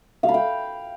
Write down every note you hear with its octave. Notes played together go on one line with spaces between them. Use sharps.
F5
B5
G5